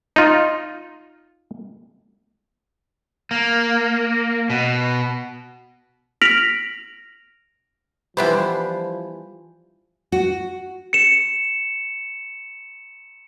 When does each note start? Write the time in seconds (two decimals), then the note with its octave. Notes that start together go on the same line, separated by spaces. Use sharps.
0.16 D#4 F4
3.31 A#3
4.50 B2
6.22 F6 A#6 B6 D7 F7 F#7
8.17 D3 E3 F3 G3 B3 C5
10.12 F#4
10.93 C#7 E7